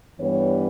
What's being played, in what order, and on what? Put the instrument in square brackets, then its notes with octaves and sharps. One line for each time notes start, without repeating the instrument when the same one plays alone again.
[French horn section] G2 E3 G3 B3 C#5